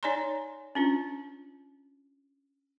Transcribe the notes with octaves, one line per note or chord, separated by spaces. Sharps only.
D#4 C#5 D5 G#5 A#5 C6
C#4 D4 F4